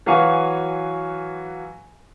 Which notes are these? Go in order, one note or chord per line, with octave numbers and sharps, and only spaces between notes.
E3 F#3 F#4 F5 G#5 C#6